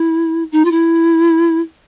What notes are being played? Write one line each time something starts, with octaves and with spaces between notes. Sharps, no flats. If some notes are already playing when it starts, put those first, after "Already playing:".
Already playing: E4
D#4
F4
E4